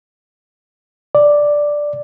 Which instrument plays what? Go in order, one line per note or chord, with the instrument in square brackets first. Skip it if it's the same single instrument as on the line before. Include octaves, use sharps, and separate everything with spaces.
[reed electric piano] D5